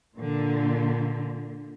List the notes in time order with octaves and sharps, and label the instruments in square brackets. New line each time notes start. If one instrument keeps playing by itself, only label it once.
[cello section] A#2 D3